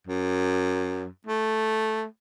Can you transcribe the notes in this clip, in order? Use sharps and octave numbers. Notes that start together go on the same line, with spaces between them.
F#2
A3